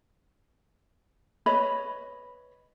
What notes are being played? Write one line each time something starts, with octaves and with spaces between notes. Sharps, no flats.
B4 C#5 D#5 B5